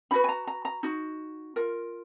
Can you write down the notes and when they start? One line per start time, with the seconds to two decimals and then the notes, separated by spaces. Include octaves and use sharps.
0.11 D#4 F#4 B4 B5
0.24 G#5
0.29 A#5
0.47 A#5
0.65 A#5
0.83 D#4 F#4
1.56 F4 A#4